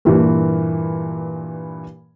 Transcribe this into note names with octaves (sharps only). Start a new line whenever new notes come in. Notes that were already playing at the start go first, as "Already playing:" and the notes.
G2 A#2 E3